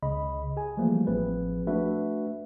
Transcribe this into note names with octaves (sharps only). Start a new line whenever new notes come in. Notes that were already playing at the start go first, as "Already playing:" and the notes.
C#2 C#3 D#5 B5
G#4 G#5
E3 F3 G3 A3 A#3
A1 F3 C4 G#4 B4
A3 D4 F#4 B4 E5